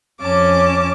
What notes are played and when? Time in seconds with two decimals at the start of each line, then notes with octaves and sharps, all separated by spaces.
0.21 F2 C#4 A5 D6